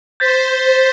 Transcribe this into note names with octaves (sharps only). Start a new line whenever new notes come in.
C5 G6 A6 B6